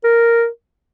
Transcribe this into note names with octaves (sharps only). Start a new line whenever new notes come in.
A#4